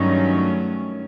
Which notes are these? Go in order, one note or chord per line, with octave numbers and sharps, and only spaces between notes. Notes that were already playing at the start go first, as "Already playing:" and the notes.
Already playing: G2 D#3 F#3 A3 C#4 D#4